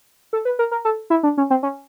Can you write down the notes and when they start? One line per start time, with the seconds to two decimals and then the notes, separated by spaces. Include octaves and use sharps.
0.33 A4
0.45 B4
0.59 A#4
0.71 A#4
0.85 A4
1.10 E4
1.23 D4
1.38 C#4
1.50 C4
1.63 C#4